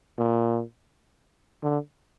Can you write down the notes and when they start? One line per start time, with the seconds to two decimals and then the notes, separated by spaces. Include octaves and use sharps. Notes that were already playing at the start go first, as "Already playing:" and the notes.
0.18 A#2
1.63 D3